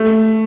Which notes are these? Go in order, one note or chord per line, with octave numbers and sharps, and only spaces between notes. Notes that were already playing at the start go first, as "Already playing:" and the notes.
Already playing: A3